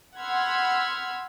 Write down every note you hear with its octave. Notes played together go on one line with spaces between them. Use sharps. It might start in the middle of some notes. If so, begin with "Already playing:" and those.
F#5 B5 C6 E6 F6 G#6